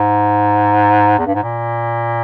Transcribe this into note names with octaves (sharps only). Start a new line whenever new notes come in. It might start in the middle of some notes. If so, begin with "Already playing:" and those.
Already playing: G#2
E2
G2
G#2
A#2